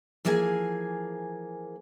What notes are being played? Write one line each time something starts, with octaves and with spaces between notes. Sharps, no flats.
E3 F3 A#3 G#4 E5 G#5